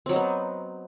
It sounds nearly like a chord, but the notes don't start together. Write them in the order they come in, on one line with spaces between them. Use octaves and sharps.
C4 F#3 D#4 B3